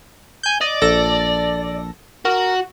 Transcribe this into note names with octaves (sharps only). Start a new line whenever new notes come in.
G#5 G6
D5 D#5
A#1 A4 A#6
F#4 A#4